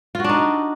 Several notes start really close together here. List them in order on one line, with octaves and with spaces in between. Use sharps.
F4 F#4 D4 D#4